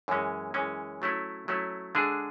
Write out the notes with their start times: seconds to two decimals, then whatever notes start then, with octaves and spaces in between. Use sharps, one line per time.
0.08 F#2 E3 G#3 C#4
0.54 F#2 E3 G#3 C#4
1.02 F#3 A3 C#4 E4
1.48 F#3 A3 C#4 E4
1.95 D3 G#3 D4 G#4